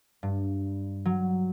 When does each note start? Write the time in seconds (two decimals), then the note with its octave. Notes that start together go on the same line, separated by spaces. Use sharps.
0.23 G2
1.05 F#3